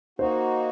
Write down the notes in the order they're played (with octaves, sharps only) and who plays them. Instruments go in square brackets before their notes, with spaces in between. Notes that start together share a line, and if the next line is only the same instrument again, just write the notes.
[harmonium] A#3 D#4 F#4 [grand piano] C5